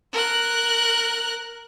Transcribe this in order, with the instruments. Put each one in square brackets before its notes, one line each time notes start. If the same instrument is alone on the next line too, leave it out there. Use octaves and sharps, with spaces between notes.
[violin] A#4 F#6